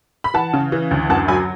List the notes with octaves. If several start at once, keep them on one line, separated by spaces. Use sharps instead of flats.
B5
E3 F#5 A5
C#3
E3
D2
F#2 F#5 A5
F#3 G#5 B5